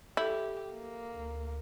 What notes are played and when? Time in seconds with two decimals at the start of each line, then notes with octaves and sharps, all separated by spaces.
0.17 E4 G4 A4 G6
0.73 A#3
1.15 D2